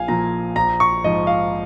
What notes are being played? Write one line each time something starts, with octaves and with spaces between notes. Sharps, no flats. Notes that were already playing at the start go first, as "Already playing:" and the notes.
Already playing: A#1 F5 G#5
A#2 F3 A#5
A#1 A#5
C#6
G#2 F3 D#5
F5